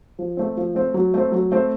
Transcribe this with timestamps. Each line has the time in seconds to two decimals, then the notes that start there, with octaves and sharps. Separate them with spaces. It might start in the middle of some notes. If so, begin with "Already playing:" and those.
0.19 F3
0.37 A3 C4
0.57 F3
0.75 A3 C4
0.94 F#3
1.14 A3 C4
1.32 F#3
1.52 A3 C4